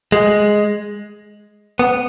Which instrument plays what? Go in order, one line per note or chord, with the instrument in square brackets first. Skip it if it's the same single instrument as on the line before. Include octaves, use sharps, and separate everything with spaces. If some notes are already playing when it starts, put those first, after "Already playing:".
[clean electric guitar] G#3
B3